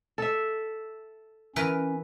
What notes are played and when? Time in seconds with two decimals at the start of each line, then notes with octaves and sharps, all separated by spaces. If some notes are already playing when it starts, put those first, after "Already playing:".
0.18 A4 E5
1.56 E3 C#4 A#4 B4